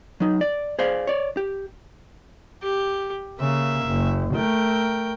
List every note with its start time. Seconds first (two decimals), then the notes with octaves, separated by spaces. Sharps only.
0.20 F#3 D#4
0.41 D5
0.79 G#4 C5 D5 F5
1.07 C#5 D5
1.37 G4
2.62 G4
3.39 C#3 A#3 E5
3.86 F#1
4.34 A3 A#4 G5